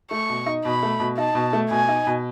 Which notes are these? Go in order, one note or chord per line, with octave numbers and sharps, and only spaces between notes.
A3 C#6
B2
D#4
B2 B5
A3
B2
D#4 A5
B2
A3
B2 G#5
D#4
B2